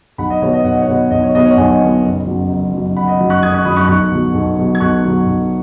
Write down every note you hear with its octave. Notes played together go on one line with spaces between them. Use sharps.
B1 F#5 B5
D#5
B2 B3 C#5
D#5
B1 F#5
D#5
C#5 F#5
B2 B3
B1 D#5
C#5
B2 B3 D#5
C#5 F#5
B1 D#5 G#5
B2 B3
F#1
F#2 F#3
F#1
F#2 F#3
F#1 F#5 B5
D#5
F#2 F#3 D#5
C#6 F#6
F#1 D#6 G#6
C#6 F#6
F#2 F#3 B5 D#6
C#6 F#6
B1 C#6 F#6
B2 F#3
B1
B2 F#3
G#6
B1 C#6 F#6
B2 F#3
B1